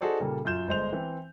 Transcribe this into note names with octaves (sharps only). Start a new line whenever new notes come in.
D#4 F#4 G#4 A4 C5 D5
A#2 C#3 G3 A#3 A4
F#2 F4 G6 E7
G1 G#3 C5 F7
E3 C4